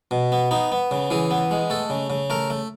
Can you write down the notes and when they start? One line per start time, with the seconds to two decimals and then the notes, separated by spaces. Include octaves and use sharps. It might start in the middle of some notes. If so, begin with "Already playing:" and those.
0.11 B2
0.32 B3
0.51 B3 D#4
0.72 B3
0.91 C#3
1.11 E3 G#4
1.31 B3
1.51 G#3
1.70 A3 A4
1.90 C#3
2.10 C#3
2.30 A3 A#4
2.50 A3